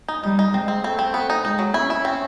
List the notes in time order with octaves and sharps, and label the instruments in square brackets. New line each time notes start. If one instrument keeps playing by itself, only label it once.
[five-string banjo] D#4
[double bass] G3 [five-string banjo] D#4
[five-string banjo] D#4
[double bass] G#3 [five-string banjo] C4
[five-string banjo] C4
[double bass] A3 [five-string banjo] C4
[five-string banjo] C4
B3
D#4
[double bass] G#3 [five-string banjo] D#4
[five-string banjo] F#3
[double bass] C#4 [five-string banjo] E4
[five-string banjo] E4
C4